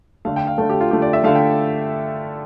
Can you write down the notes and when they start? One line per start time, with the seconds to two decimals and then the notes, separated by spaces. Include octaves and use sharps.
0.25 D3 A3 F5
0.36 G5
0.47 F5
0.58 D3 A3 A4
0.70 G4
0.81 F4
0.91 D3 A3 G4
1.02 D5
1.13 E5
1.24 D3 A3 F5
1.35 G5